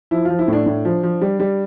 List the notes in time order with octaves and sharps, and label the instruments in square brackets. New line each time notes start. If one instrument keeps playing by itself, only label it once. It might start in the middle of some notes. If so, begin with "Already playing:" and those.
[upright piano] F3 E4
F3 F4
E4
A2 D4
A2
F3
F3
G3
G3